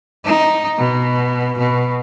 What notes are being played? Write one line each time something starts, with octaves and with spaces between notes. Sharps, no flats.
D#4
B2
B2